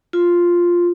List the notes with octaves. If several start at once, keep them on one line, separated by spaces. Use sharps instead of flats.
F4